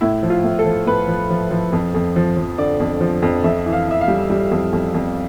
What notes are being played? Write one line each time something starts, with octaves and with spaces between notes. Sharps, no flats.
A2 E4
F3
F4
A2
A4
F3
A2 B4
F3
F3
F3
F2
F2
F3
F3
D3 D5
F2
F3
F2
F2 E5
E3
F5
E3 E5
F5
G3
G3
F2
F2
F2